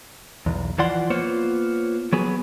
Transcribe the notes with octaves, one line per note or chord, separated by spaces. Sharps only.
B1 E2
E3 F3 D5 F#5 C6
A#3 B3 F4 C5 C#5
F#3 B3 G#4